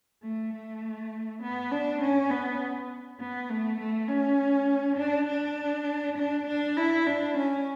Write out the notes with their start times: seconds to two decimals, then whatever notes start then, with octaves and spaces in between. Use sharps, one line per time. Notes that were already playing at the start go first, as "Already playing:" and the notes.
0.22 A3
0.53 A3
1.42 B3
1.72 D4
2.01 C#4
2.30 B3
3.20 B3
3.50 A3
3.80 A3
4.09 C#4
4.98 D4
5.28 D4
6.18 D4
6.47 D4
6.77 E4
7.06 D4
7.37 C#4